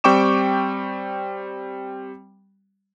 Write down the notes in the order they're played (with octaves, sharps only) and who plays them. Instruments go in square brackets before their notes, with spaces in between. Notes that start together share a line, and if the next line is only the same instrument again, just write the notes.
[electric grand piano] G3 C4 G5 C#6 D6 E7